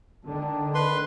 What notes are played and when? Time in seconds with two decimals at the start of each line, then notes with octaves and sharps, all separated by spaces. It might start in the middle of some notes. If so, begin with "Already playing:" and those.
0.25 D3 D#3 D4
0.75 B4 C6